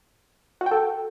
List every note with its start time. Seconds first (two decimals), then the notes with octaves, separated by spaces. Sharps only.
0.61 F#4
0.66 G5
0.71 A4